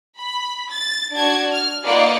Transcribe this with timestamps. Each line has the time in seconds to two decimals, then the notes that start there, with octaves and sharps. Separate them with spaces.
0.18 B5
0.71 A6
1.14 D4 F#4 A5 G#6
1.52 F6
1.83 A#3 D#4 F4 B4 D5 F#5